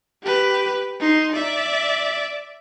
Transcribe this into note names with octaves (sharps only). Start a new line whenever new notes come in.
G4 B4
D#4 C6
D5 E5